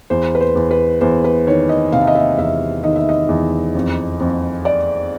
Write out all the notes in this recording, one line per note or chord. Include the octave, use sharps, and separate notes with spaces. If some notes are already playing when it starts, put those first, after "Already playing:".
E2 C5
B4
C5
E2
B4
E2 C5
B4
D#3 C#5
D#5
C3 F5
E5
D#5
E5
E2 E5
D#3 D#5
E5
D#5
E2
F2
F2
D5